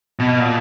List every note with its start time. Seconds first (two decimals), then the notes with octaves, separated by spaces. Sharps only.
0.19 B2
0.40 A#2